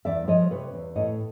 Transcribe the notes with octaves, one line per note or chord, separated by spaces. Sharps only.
E2 D5 E5
F3 C#5 D#5
C3 B4 C#5
E2
A2 C#5 D#5